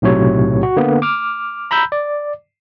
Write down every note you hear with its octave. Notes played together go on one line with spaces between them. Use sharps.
B1 A2 C3 F#3 C#5
F#4
D3 A#3 B3
D6 F6
A#5 B5 E6 G6
D5